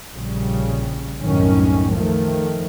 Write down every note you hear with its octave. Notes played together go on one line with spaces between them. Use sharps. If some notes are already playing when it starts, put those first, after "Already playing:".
A#1 C#3 G3
C2 F#2 A2 D#3 C#4
D#3 F3 A3